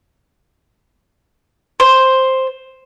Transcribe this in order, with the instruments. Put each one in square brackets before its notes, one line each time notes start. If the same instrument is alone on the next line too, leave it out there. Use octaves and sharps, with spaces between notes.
[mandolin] C5